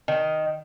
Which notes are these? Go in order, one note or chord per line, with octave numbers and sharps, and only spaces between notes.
D#3